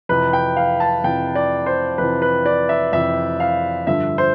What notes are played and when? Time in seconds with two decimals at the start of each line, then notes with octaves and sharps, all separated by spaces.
0.09 F2 C3 E3 B4
0.33 G5
0.57 F5
0.80 A5
1.04 F2 C3 E3 G5
1.35 D5
1.66 C5
1.98 F2 C3 E3 B4
2.22 B4
2.46 D5
2.69 E5
2.93 F2 C3 E3 E5
3.40 F5
3.87 G2 D3 F3 E5
4.18 C5